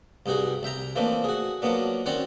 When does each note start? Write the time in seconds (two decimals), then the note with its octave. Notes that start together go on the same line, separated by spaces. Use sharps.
0.26 C2 G2 D#4 F#4 G#4
0.63 C2 E5 G5 A#5
0.96 E3 F3 A3 A#3 C4 D4
1.24 F#4 G#4
1.62 F3 F#3 A#3 B3 D4
2.06 D#3 C4 C#4 F#4 C#5 D5